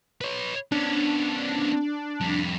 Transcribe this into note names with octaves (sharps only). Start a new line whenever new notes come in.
B4 C#5
B3 C#4 D4
F2 G3